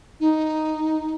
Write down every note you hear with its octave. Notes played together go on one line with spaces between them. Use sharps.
D#4